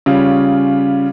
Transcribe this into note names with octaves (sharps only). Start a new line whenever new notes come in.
C#3 G3 C#4 F4